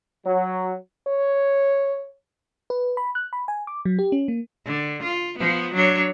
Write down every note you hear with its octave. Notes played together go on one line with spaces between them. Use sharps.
F#3
C#5
B4
B5
F#6
B5
G#5
D6
F#3
G4
C#4
A#3
D3
F4
F3 B3
F#3 D4 C#5